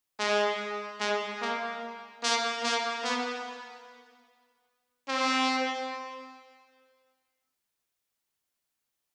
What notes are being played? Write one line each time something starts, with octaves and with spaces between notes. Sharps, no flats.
G#3
G#3
A#3
A#3
A#3
B3
C4